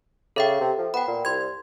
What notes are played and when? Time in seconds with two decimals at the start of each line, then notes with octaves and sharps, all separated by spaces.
0.36 C#3 A4 E5 G5
0.61 C3
0.78 F3
0.94 B3 G5 B5
1.08 A#2
1.25 C2 C6 G#6